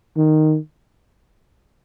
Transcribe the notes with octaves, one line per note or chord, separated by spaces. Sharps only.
D#3